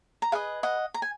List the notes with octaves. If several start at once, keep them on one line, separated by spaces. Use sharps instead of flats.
A#5
G#4 B4 D#5 F5 G#5
D#5 F#5
A#5
G#5